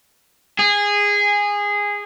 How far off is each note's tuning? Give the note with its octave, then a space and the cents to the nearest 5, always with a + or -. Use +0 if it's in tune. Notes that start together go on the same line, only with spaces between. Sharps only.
G#4 -15